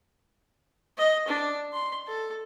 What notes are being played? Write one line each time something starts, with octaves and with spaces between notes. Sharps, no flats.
D#5
D4
C6
A4